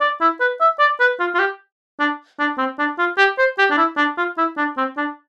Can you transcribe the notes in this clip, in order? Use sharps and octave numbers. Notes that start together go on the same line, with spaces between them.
D5
E4
B4
E5
D5
B4
F4
F4
G4
D4
D4
C4
D4
F4
G4
C5
G4
D4
E4
D4
F4
E4
D4
C4
D4